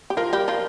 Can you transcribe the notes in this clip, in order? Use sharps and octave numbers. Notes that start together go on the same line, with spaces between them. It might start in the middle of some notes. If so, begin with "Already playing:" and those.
G4
F3 F4 A#4
G3 G4
F3 F4